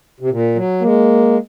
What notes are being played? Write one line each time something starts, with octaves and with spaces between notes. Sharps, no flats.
C3
A#2
F#3
G#3 A#3